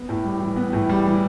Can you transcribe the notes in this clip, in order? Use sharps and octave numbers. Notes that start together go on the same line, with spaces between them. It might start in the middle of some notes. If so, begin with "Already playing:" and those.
Already playing: B3
A2
G3
E3
B3
A2
G3
E3